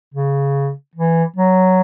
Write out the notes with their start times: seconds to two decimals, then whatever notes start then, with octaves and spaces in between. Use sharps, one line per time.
0.14 C#3
0.96 E3
1.36 F#3